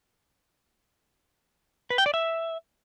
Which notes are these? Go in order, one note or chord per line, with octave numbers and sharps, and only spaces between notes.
B4
G5
D5
E5